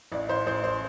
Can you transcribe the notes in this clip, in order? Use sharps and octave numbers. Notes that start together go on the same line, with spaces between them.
A1 D5
A1 C5
A1 C5
C5